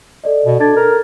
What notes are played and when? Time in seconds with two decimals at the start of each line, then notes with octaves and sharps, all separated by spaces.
0.24 A4 D5 D#5
0.46 B2
0.60 D4 A4 G#6 A6
0.77 A#4